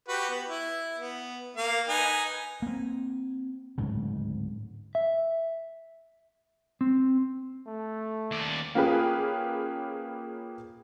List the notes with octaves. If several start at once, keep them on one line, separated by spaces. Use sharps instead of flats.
F#4 G4 B4
B3
E4
B3
A#3 F5
D#4 B4 G#5
A#3 C4
D1 G#2 C#3
E5
C4
A3
D#2 D5
A#3 C#4 F4 G4 G#4 B4